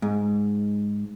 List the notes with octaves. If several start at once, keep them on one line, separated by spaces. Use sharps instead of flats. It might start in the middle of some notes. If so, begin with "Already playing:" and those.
G#2